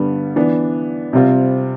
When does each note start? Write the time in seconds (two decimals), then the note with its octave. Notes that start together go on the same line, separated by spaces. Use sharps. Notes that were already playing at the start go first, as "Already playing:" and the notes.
Already playing: G2 D3 G3 B3
0.36 E3 B3 D4
1.13 C3 G3 C4 F4